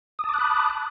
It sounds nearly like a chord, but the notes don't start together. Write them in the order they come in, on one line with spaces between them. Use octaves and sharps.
D#6 A5 D6 F#6 B5